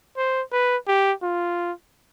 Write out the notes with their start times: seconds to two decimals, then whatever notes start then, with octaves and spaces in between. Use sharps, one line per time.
0.17 C5
0.52 B4
0.87 G4
1.22 F4